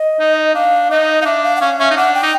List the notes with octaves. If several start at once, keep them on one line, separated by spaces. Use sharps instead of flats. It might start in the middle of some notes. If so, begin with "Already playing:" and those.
Already playing: D#5
D#4
D4 F5
D#4 D#5
D#4 F5
D4 E5
F5
F#5
C#4 F5
C#4 E5
D#4
D4 F#5
G5
D#4